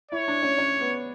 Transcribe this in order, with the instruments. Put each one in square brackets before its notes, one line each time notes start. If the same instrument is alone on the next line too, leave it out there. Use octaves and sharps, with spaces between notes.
[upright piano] E4 [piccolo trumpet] C#5
[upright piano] D4
C#4
C#4
B3